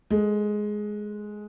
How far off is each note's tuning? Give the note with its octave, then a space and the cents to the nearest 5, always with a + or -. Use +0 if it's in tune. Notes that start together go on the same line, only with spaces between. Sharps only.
G#3 +10 A4 +0